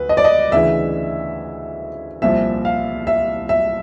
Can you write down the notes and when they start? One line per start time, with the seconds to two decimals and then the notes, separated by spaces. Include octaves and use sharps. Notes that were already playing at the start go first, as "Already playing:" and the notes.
Already playing: D2 B4
0.09 D#5
0.17 D5
0.24 D#5
0.52 D2 C#3 E3 E5
2.22 C2 A#2 F3 E5
2.65 F5
3.07 E5
3.49 E5